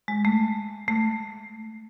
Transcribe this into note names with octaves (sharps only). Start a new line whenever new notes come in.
G#3
A3
A3